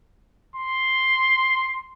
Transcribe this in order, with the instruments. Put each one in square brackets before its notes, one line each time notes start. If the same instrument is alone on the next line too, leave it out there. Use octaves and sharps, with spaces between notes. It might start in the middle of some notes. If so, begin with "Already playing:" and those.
[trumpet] C6